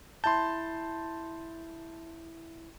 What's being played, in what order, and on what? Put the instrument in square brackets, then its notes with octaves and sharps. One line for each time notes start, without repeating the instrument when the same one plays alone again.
[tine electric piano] E4 G6 [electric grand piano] A5 C6